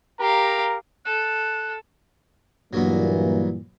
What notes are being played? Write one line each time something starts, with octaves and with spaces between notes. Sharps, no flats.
G4 A#4 F5 A#5
A4 F#6
G2 A#2 E3 F#3 A#3 B3